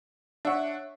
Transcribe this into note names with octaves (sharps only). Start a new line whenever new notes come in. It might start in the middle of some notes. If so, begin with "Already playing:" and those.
D4 C#5 E5 F#5